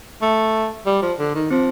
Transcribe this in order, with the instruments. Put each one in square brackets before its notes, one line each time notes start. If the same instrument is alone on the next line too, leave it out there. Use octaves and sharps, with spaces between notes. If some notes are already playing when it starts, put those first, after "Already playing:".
[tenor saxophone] A3
G3
F3
D3
D#3
[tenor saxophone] F3 [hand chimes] C4